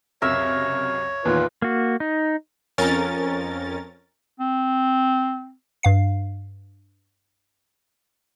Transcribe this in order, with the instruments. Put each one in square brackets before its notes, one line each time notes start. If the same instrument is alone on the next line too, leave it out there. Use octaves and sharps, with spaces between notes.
[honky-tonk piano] C#2 F#2 C3 [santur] A#4 E5 E6 [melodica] C#5
[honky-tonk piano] E2 A#2 D#3 [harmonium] F4 B4
[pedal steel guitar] A#3 F#4
D#4
[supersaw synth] F2 C#4 A#4 A6
[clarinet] C4
[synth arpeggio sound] G2 F5 C7